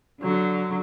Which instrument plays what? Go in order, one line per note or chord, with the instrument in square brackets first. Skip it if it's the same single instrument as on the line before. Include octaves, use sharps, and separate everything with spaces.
[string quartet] D3 F#3